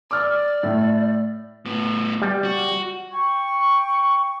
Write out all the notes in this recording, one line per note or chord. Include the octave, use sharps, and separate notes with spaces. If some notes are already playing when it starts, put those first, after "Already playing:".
D5 D6 F6
A2
A2 B3
G3
F#4
G5 C#6